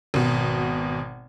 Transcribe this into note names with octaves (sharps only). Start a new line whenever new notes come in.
G#1 B2